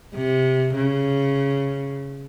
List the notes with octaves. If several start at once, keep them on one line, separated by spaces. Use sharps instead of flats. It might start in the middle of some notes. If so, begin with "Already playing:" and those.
C3
C#3